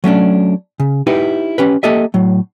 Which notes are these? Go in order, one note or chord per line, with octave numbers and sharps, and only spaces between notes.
F#3 A3 C#4 D4
C#3
D#4 E4 G4 B4
C#4 G4 B4
A#3 G4 A4 D#5 E5
A2 F#3